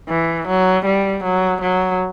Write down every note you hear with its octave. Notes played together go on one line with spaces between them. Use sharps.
E3
F#3
G3
F#3
F#3